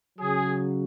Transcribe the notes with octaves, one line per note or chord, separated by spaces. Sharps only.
C#3 F#3 G#4